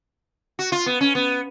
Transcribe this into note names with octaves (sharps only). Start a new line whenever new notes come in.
F#4
F4
B3
C#4
B3